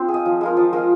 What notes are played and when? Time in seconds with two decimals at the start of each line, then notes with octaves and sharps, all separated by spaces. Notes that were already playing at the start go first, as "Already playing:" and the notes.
Already playing: C4 F4
0.08 G#4
0.14 D#5
0.26 F3
0.41 G#3 F4 A#4
0.57 F3
0.73 G#3 F4 A#4